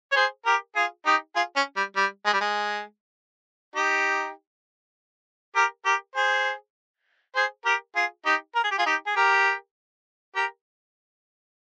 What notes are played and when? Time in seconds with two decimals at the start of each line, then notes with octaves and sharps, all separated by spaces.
0.12 C#5
0.16 G#4 C5
0.45 G4 A#4
0.75 F4 G#4
1.06 D#4 G4
1.36 F4 G#4
1.56 C#4
1.77 G3
1.96 G3
2.26 G#3
2.33 G3
2.41 G#3
3.75 D#4 G4
5.56 G4 A#4
5.85 G4 A#4
6.15 G#4 C5
7.36 G#4 C5
7.65 G4 A#4
7.96 F4 G#4
8.25 D#4 G4
8.55 A#4
8.64 G#4
8.71 G4
8.78 F4 G#4
8.86 D#4 G4
9.06 G#4
9.16 G4 A#4
10.35 G4 A#4